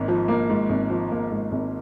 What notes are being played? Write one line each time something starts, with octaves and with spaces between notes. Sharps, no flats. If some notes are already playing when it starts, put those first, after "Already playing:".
Already playing: G#1 G#2 A#3
F3
A#3
G#2
G#1
F3
A#3
G#2
G#1